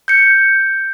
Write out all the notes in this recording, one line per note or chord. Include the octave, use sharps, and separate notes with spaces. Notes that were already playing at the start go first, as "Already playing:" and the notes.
G6 C#7